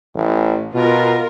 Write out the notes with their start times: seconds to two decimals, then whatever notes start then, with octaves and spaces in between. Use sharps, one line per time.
0.15 A1
0.74 B2 F4 A#4